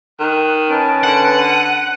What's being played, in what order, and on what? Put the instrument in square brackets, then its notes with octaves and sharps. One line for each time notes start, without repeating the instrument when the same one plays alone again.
[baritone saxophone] D#3 [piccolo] F#6
[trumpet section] C#4 B4 A5 [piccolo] D7
[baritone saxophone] D3 [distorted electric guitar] F#5
[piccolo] D#7